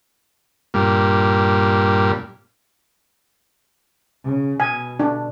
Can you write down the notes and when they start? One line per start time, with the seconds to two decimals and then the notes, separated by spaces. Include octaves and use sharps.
0.74 G2 A#2
4.24 C#3
4.60 B2 G#5
5.00 D4